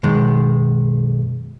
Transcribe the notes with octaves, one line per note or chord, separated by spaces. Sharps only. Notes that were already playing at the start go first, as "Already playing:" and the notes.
B1 F#2 D#3 G#3